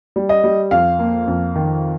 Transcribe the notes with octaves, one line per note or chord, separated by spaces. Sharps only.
G3
D#5
G3
F2 F5
A#3
F2
D#3